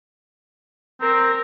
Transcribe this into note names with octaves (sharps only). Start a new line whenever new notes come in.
C4 A#4